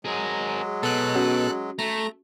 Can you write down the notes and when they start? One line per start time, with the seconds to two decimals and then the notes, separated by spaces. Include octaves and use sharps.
0.05 F#3 G#3 G#4 A#4
0.83 B2 A4 F#6
1.15 C#4 F#4
1.79 A3 A#5